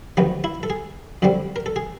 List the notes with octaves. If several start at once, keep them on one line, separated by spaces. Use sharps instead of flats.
D2 C3 D#3 F#3 B3
E4
A4
G#4
F#2 D3 G3 C4
A#4
A4
G#4